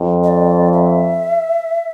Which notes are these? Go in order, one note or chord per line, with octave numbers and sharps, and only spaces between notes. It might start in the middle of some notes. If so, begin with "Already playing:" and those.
Already playing: F2
D#5
D5
E5